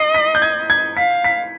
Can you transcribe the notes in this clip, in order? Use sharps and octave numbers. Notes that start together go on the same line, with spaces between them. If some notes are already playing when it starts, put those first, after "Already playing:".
Already playing: D#5 C7
B6
G6
G#6
G#6
F5 B6
B6